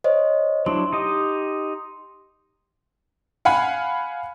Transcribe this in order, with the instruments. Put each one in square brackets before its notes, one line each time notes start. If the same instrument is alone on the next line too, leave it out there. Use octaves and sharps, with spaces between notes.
[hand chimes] C5 C#5 D#5
[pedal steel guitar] F#3 D4 E4 [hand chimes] C6
[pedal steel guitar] D#4 G4 D#5
[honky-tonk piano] F5 F#5 G#5 B5